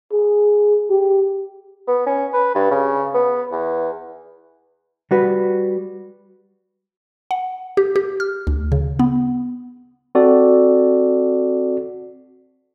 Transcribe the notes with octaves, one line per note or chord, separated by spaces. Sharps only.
G#4
G4
B3
C#4
B4
G2
C#3
B3
E2
G3 F#4 B4
F#5
G4
G4
F6
D2
C#3
B3
C4 F#4 A4 D5